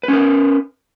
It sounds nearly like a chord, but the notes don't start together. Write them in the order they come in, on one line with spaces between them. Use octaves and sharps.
B4 C#4 A#4